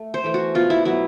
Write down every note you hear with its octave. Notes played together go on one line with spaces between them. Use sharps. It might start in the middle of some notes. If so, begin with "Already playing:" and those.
Already playing: A3
C5
E3 A3
F#4
B2 F4
E4
F#3 B3 E4